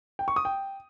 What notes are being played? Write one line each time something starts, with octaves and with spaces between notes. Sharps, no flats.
G5
C#6
D#6
G5